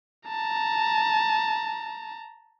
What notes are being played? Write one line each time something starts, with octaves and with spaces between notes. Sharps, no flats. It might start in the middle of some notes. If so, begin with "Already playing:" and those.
A5 A#5